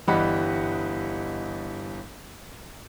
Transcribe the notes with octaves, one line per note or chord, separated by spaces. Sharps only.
G1 E3 G3 D#5 F#5 B5